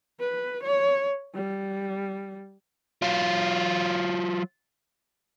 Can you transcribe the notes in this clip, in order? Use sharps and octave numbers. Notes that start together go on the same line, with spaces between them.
B4
C#5
G3
F#3 F4